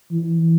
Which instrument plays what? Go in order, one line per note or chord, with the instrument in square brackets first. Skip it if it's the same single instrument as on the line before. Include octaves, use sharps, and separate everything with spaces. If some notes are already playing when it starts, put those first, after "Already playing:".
[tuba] E3